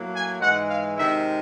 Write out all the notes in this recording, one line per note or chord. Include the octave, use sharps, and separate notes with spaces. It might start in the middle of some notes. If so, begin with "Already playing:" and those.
Already playing: A2 F#3 A#3
G#5
G#2 E3 G#3 F#5
F5
C3 D#3 G#3 E5